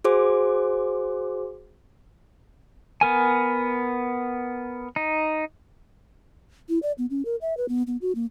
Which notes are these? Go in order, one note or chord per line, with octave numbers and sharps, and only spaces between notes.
F#4 G#4 C5 D6
B3 A#4 G#5
D#4
E4
D5
B3
C#4
A#4
E5
B4
B3
B3
F#4
A#3